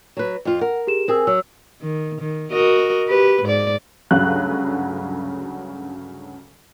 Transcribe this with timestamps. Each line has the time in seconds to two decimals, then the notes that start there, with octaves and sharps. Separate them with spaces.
0.17 F#3 B4
0.45 F2 F4
0.61 A#4 F#5
0.87 G4 G#4 E7
1.08 C4 G#4 A#4 G#5 E6
1.27 F#3 E6
1.82 D#3
2.21 D#3
2.52 F#4 A#4 D#5
3.07 G4 B4
3.44 G#2 D5
4.11 D2 G2 C#3 F#3 F5 F#6